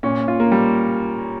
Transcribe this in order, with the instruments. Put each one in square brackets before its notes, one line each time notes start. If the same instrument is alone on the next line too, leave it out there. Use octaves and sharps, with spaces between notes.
[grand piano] A#2 [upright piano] C#4
[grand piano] F4
[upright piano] A#3
[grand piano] G3